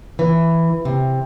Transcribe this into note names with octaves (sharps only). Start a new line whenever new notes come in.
E3
C3